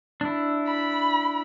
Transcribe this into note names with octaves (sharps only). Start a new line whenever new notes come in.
D4 E4
B5